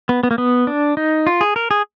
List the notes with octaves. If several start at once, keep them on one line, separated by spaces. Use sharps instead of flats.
B3
B3
A#3
B3
D4
D#4
F4
G#4
A#4
G#4